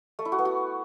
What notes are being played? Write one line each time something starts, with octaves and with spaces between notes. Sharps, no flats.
A3
E4
F#4
B3
F#4